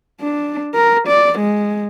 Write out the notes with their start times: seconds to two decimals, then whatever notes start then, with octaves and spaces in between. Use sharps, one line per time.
0.21 D4
0.74 A#4
1.08 D5
1.39 G#3